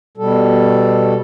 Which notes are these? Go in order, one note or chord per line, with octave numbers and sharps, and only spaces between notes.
B2 G3 A4